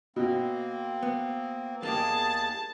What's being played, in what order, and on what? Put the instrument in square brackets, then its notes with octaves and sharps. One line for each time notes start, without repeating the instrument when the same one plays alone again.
[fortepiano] B2 [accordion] A#3 C4
[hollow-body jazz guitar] B3
[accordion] E2 G#4 [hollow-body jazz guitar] A#3 D#4 G4 [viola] A5